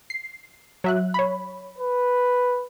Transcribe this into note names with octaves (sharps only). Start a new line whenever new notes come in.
C7
F#3 E5 F#6
C#5 B5
B4